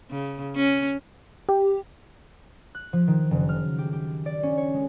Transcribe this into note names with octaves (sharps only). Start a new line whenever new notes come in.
C#3
C#4
G4
F#6
F3
D#3
F#1
F6
G4
G4
D5
C#4
C#5
G#3